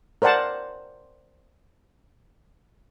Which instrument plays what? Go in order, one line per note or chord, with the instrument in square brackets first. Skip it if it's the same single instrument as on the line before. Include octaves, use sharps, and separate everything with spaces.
[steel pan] A#4 C5 D5 F#5 A5